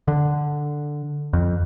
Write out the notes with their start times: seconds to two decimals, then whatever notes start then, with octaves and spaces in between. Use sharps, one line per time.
0.08 D3
1.33 F2